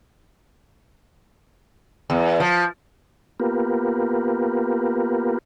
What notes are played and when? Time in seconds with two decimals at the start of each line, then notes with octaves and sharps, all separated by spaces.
2.10 E2
2.40 F3
3.40 A#3 B3 F4 G4 A#4 B4